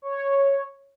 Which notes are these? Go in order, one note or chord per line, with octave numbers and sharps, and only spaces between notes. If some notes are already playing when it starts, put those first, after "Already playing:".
C#5